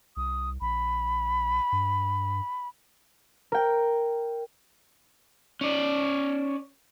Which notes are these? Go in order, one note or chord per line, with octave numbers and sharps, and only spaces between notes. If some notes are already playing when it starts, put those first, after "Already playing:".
C2 D#6
A#1 B5
G2
A#4 G5
C#4 D5